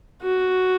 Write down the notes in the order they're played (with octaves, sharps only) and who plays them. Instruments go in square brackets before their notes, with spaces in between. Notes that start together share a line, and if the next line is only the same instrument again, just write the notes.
[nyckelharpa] F#4